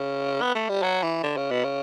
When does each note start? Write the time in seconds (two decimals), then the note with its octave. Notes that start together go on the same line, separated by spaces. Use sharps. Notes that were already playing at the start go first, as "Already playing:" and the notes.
Already playing: C#3
0.41 B3
0.55 A3
0.69 G3
0.83 F#3
1.03 E3
1.23 D3
1.37 C#3
1.51 B2
1.64 C#3